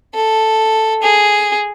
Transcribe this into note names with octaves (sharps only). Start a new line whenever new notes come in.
A4
G#4